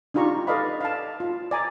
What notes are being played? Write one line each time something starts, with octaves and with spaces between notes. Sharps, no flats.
D4 D#4 F4 G4 A#5 C#6
A4 B4 D5 D#5 F5 B5
F5 A5
F4
D5 G#5 A#5